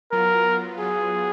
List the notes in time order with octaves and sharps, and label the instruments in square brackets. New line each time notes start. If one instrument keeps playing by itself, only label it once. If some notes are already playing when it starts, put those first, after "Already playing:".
[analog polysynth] F#3 B3 F4 [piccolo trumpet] A#4
[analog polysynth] F#3 B3 F4 [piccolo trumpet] G#4